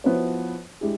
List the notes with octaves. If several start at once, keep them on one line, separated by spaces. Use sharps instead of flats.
F3 B3 E4 F#4 C5 C#5
G#3 D4 E4 G4 G#4